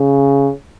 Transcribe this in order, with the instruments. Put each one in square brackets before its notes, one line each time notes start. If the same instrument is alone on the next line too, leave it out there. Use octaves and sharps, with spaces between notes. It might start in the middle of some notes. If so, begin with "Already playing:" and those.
Already playing: [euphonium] C#3